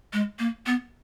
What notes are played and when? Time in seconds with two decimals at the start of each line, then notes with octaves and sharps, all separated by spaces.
0.13 G#3
0.39 A#3
0.66 B3